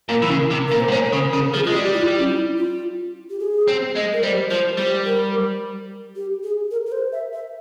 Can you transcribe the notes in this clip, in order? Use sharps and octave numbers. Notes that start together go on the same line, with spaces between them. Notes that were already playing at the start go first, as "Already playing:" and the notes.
A#2 A#4
E3
C#3
C3
A#2 A#4
C5
G#2
A#2 C#5
A#4
C#3 C5
C#3 A#4
F3 G#4
G#3 F4
G3 G4
E4
F4
C#4
E4
F4
G4
G#4
C4
G#3
A#4
G3 C5
F3 C5
G3 C5
A#4
G4
G#4
A#4
A#4
C5
E5
E5